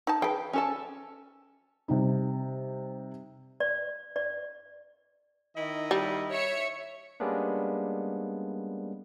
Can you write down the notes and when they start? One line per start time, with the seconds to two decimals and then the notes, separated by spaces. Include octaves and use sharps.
0.07 D#4 A5
0.22 G#4 B4 G5
0.53 C#4 A4 A5
1.88 C3 G3 D#4
3.60 D5
4.16 D5
5.55 D#3 E4 D#5
5.91 G3
6.31 C#5 E5 C#7
7.20 G3 G#3 A#3 B3 C#4 D4